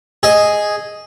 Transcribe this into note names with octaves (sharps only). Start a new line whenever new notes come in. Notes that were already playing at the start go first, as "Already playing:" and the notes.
G#4 D#5